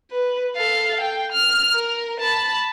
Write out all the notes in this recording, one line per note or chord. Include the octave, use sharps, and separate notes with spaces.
B4
A4 F5
G5
F6
A#4
A5 B5